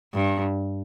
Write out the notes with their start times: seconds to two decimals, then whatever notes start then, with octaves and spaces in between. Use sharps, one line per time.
0.14 G2